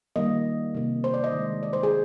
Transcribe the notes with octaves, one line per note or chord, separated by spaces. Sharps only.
D#3 G3 A#3 D#5
C3 D#3 A#3
C5
D5
D#5
D#3 G#3
D5
C5
G#4